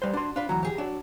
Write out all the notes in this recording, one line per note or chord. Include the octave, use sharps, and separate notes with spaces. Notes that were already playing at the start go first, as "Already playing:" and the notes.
G3 B4 C5
D4 F#4 C6
D4 F4 B4
D2 E3 F#3 A#5
G4 G#4
F#3 D4